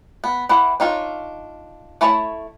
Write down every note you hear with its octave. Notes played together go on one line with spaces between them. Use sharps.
B3
E3 E4 F#5
D4 D#4 F4 C#5
A3 E4 C#5 A5